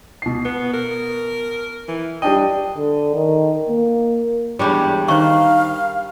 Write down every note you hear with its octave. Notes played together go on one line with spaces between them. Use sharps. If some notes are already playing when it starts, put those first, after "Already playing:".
B2 C7
B3
A#4
E3
G3 D4 D#5 G5
D3
D#3
A#3
E2 G3 G#3 D4 G4 C#5
D#3 C5 F5 A#5 C#6